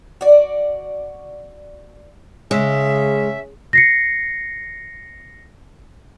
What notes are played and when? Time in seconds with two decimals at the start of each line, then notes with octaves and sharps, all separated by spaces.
0.21 F#4 D5
2.51 C#3 G#3 C#4 E5
3.73 A#6 C7 C#7